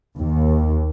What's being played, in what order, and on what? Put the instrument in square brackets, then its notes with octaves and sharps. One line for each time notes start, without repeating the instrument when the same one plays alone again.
[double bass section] D#2